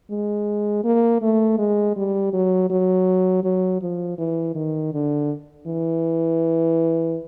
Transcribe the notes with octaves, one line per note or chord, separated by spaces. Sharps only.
G#3
A#3
A3
G#3
G3
F#3
F#3
F#3
F3
E3
D#3
D3
E3